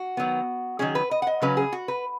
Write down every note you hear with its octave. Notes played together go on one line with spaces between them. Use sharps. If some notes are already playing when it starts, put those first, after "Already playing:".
Already playing: F#4
D#3 F#3 B3
D#3 F#3 C#4 G#4
B4
D#5
F#5
D#5
C#3 F#3 C#4 B4
G#4
F#4
B4